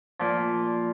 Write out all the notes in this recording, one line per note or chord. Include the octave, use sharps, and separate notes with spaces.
A#2 F3